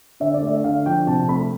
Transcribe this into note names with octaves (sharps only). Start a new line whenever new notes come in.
D3 E5
D5
A3 E5
D3 F5
F3 G5
C3 A5
A3 B5